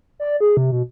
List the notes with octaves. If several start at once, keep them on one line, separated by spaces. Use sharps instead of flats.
D5
G#4
C3
B2